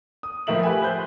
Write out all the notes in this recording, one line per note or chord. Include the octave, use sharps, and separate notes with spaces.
D#6
A2 F3 A3 A#4 E5 F#7
G4 B4 E5 G5 G#5
B4 C5 G6